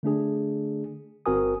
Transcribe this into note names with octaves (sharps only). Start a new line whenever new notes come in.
D3 A3 D4 G#4
G1 C4 F#4 A#4 G#5 D#6